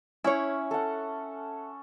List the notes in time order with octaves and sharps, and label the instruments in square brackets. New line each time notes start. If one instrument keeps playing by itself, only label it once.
[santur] C#4 [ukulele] E4 C#5
[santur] A4 F#5